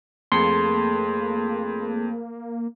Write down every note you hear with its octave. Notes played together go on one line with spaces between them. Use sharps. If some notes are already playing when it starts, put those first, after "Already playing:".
F2 A3 A#3 G#4 A4 C6